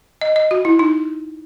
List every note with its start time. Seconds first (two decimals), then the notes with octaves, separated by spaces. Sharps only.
0.21 D#5
0.36 D#5
0.51 F#4
0.65 E4
0.79 D#4